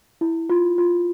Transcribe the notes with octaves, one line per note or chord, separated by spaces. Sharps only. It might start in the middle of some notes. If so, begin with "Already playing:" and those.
E4
F4
F4